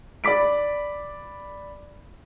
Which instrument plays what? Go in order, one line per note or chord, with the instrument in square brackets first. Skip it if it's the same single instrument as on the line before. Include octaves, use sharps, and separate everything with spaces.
[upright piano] D5 B5 D6 B6 D7